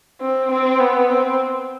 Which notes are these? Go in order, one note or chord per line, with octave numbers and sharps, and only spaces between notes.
C4
C4
B3
C4